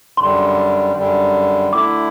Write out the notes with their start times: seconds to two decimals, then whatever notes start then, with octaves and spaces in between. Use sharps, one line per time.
0.17 F#2 D3 G3 C6
0.95 F#2 D3 G3
1.72 D3 A3 E4 D6